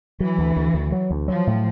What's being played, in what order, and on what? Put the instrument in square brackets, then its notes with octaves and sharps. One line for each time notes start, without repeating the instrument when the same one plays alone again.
[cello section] E3 [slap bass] F#3
[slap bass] D2
D2
D2
F#3
D2
[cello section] F3 [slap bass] F#3
[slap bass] A2